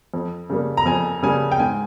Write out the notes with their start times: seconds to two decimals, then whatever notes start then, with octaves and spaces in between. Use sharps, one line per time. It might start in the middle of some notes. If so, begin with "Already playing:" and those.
0.14 F2
0.50 C#3 G3 A#3
0.77 A#5
0.86 F2 G#5
1.23 C#3 G3 A#3 G#5
1.52 G5
1.60 G#2 G#5